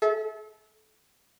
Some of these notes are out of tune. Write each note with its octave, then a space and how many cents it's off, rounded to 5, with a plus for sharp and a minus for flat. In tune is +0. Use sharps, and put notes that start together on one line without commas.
A4 -35 E5 -30